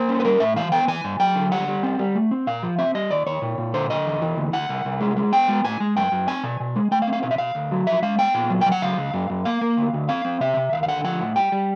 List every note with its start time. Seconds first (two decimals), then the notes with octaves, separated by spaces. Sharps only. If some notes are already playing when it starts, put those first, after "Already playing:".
Already playing: A#3 C5
0.09 C#4
0.20 B4
0.25 G3 A#4
0.40 A2 E5
0.56 E3 F5
0.72 B3 G5
0.88 E3 G#5
1.04 G2
1.20 F#3 G5
1.36 D3
1.52 G3 F#5
1.68 G3
1.83 C4
1.99 G3
2.15 A3
2.31 C4
2.47 A#2 F5
2.63 F3
2.79 C4 E5
2.95 G3 D#5
3.10 D#2 D5
3.26 D#2 C#5
3.42 A#2
3.58 A#2
3.74 D3 C5
3.90 D3 D#5
4.06 E2
4.22 E3
4.37 D2
4.53 D2 F#5
4.69 C2
4.85 C2
5.01 G#3
5.17 G#3
5.32 B3 G5
5.48 G#3
5.64 A2 G#5
5.80 G#3
5.96 F#2 G5
6.12 F#2
6.28 C4 G#5
6.43 B2
6.60 B2
6.76 G#3
6.91 A3 G5
7.02 F5
7.07 C4
7.13 F5
7.23 B2 F5
7.31 E5
7.38 B2 F5
7.55 D2
7.71 F#3
7.87 F3 E5
8.02 G#3 F5
8.18 B3 G5
8.34 A#2
8.50 F#3
8.61 F#3 G5
8.72 F#5
8.82 C#2 F5
8.97 C#2
9.14 F#2
9.30 F#2
9.45 A#3 F5
9.61 A#3
9.77 D2
9.93 D2
10.09 C4 F5
10.25 C4
10.40 C3 E5
10.57 C3
10.72 D#2 F5
10.83 F5
10.88 D3 F#5
11.04 F3 F#5
11.20 A2
11.36 G3 G5
11.52 G3